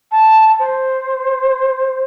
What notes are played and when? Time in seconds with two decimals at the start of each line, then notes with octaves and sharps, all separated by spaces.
0.12 A5
0.59 C5